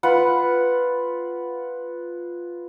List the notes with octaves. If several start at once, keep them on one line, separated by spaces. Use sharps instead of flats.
F4 B4 F#5